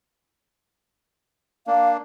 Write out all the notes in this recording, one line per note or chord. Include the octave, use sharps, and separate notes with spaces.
A#3 D4 F5